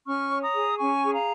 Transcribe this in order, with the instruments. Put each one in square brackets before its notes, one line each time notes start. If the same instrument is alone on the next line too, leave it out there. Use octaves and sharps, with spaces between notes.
[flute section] C#4 C#6 F6
C#5
A#5 D#6
G#4
C#4 G#5 C#6
G#4
F5 A#5